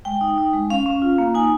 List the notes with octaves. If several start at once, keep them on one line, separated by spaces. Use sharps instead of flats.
G#3 G5
D#4
D#4
G#3
C#4 F5
C#4
F4
A#3
D#4 G#5